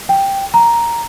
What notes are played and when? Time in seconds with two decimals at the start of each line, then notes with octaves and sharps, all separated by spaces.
0.09 G5
0.54 A#5